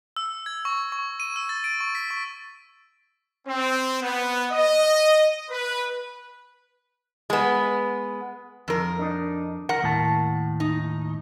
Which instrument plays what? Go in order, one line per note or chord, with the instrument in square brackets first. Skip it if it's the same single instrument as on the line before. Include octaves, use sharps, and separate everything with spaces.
[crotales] E6
G#6
C#6
C#6
D#7
E6
A6
D7
C#6
B6
C#6
[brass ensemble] C4
B3
D#5
B4
[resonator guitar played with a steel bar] G#3 B3
F2 A#4
[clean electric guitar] D4 D#4
[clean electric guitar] A#4 [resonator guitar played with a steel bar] F#5
[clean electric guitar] D#2 A2 A5
[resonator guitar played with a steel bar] D#4